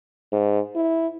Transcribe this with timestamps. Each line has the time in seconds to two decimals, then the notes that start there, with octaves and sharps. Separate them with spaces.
0.32 G#2
0.76 E4